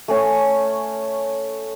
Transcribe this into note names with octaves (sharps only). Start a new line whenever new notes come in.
A3 C#4